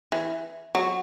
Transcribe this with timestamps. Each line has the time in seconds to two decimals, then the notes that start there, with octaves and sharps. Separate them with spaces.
0.12 E3
0.75 F#3